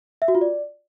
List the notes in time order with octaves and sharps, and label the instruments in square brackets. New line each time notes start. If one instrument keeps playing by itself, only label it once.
[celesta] E5
F#4
F4
D5